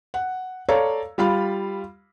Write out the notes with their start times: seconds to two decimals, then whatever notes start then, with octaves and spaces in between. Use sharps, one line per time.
0.14 F#5
0.69 A4 C#5 D5 F5 A#5
1.18 G3 F4 F5 B5